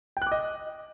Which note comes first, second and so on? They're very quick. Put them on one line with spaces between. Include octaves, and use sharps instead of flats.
G5 F#6 D6 D#5